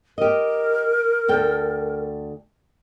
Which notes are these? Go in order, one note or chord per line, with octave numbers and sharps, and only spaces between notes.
G4 A#4 D#5
D2 A4 G5